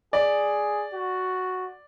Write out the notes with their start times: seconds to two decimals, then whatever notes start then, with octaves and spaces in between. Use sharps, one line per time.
0.13 G#4 D5
0.93 F#4